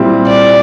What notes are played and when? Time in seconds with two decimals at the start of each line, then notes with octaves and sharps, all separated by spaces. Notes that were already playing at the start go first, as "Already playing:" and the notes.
Already playing: A#2 G3 C4 E4
0.27 D5